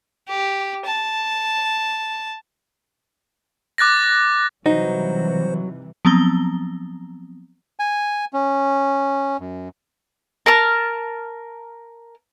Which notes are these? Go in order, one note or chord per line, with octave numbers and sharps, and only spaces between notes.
G4
A5
D6 F#6 A6 A#6
C3 E3 F#3 G3 D#4 F#4 C5
F3 F#3 B3 C4 A#5 G7
G#5
C#4
F#2
A#4 A5 F6